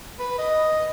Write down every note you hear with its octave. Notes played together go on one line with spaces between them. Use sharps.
B4
D#5